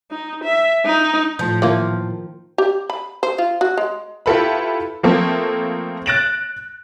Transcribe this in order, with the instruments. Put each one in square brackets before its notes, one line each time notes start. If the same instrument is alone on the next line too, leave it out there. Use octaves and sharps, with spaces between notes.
[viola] D#4
E5
D#4
[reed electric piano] A2 A5 G6 [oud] F3
[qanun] D#3 F4 [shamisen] E3 A#3
[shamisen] G4
B5
C5
F4
F#4
G#3
[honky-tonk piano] E4 F4 G4 A4 B4 B5
F3 A3 A#3 C4 A4
F#6 A6 A#6 D7 E7 F#7